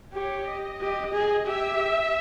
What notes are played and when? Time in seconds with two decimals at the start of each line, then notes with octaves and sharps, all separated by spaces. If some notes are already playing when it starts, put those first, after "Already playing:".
0.13 G4 C#5
0.47 D#5
0.80 G4
1.13 G#4
1.46 G4 E5